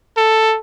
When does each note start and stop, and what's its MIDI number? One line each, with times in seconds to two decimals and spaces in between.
0.17 0.58 69